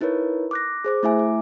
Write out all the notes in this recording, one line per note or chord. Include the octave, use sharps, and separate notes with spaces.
D#4 E4 A#4 B4 C#5
D6 F#6 A#6
G#4 C5 D6
A3 E4 E5 G#5
D6